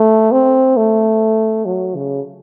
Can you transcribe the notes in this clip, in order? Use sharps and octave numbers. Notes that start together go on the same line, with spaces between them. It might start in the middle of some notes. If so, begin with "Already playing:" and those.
Already playing: A3
C4
A3
F#3
C#3